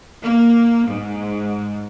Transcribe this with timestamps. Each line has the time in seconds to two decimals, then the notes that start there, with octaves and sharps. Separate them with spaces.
0.22 A#3
0.88 G#2